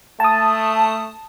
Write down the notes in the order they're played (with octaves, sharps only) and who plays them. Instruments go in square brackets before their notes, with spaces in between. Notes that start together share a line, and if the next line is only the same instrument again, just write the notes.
[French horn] A3 [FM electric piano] A5 D#6